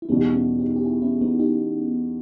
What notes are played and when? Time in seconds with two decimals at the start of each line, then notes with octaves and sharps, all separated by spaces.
0.02 E4
0.09 E2 B2 G3 B3 D#4
0.34 C#4 E4
0.59 D#4 G4
0.76 G4
0.84 E4 G#4
1.02 C#4 E4
1.21 B3 D#4
1.39 D#4 G4